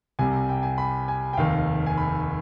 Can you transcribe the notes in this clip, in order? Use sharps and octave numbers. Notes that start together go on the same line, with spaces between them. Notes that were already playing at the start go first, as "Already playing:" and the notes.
C2 C3 G3 G#5
G5
G#5
B5
G#5
G5
F1 D#2 D#3 F5
G#5
B5